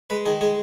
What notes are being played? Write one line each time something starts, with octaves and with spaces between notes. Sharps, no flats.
G#3 B4
D#3 G#4
G#3 G#4